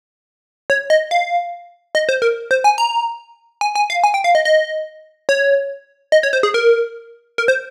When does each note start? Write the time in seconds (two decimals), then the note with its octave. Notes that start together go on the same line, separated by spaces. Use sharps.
0.70 C#5
0.90 D#5
1.11 F5
1.95 D#5
2.09 C5
2.22 A#4
2.51 C5
2.64 G#5
2.78 A#5
3.61 G#5
3.75 G#5
3.90 F5
4.04 G#5
4.14 G5
4.24 F5
4.35 D#5
4.45 D#5
5.29 C#5
6.12 D#5
6.23 C#5
6.33 C5
6.43 G#4
6.54 A#4
7.38 A#4
7.48 C5